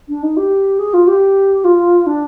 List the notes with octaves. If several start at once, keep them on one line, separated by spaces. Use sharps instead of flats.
D4
D#4
G4
G#4
F4
G4
F4
D4